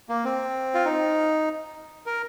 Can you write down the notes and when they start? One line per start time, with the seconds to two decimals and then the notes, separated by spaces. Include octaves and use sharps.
0.09 A#3
0.25 C4
0.74 F4
0.85 D#4
2.06 A#4